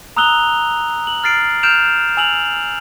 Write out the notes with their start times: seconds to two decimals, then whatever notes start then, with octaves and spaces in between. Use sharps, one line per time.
0.17 A#5 D#6 E6 F#6 F7 G7
1.07 F#7
1.24 F6 A6 C7 D7
1.63 F6 G6 D7 E7 F7
2.17 G#5 E6 F7 F#7